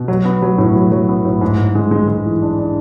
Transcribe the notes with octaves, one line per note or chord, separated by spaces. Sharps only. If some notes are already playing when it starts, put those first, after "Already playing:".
Already playing: B2
F#3
B3
F#3
A2
F#3
F#3
B3
A2
G#2
G#2
G#3
G#3
G#3
E3
D4
D4